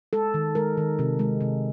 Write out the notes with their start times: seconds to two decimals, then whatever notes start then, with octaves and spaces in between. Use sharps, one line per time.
0.13 G#3 A4
0.34 D#3
0.55 G#3 A#4
0.77 D#3
0.99 C3
1.19 G#3
1.41 C3